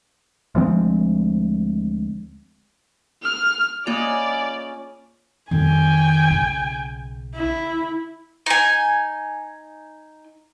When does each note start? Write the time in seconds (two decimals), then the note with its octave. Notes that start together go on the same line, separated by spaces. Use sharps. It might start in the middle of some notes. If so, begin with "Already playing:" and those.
0.55 D2 F3 G#3 C4
3.23 F6
3.86 C#3 A#3 C#4 F4 D5 D#5 F7
5.51 F2 D#3 G3 G5 G#5
6.31 B1 C#3
7.35 E4
8.46 D#4 G#5